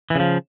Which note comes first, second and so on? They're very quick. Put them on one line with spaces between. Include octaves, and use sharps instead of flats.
E3 C#3 F3